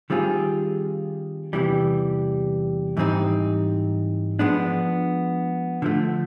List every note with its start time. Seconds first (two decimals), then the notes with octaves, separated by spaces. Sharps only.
0.10 D#3 G3 C4 F4 G#4
1.53 E2 C3 E3 G3
2.97 G#2 E3 G3 C4 D#4
4.39 F3 G#3 B3 D4
5.82 D3 F3 A3